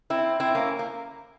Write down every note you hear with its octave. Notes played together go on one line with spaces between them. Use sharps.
C4 E4
C4 E4
A#3 C#4
A#3